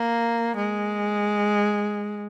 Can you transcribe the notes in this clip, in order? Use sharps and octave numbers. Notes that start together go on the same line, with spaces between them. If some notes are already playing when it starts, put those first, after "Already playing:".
Already playing: A#3
G#3